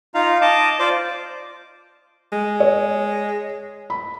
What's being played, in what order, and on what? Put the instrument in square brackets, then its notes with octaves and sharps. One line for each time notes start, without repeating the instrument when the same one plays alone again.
[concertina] D#4 F4 F5 A#5
D#5 A5 D6
F4 C5 D5 D6
[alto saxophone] G#3
[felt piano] C#5
B5